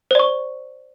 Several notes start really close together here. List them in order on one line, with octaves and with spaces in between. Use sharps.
C5 D5 C#6